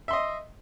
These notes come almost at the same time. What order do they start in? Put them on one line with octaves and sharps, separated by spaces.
E5 C6 D#5